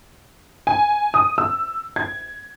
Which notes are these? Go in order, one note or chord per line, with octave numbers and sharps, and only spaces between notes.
G#5
D#6
E6
G#6